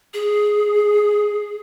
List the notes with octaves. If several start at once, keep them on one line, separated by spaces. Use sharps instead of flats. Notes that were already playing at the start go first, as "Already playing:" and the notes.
G#4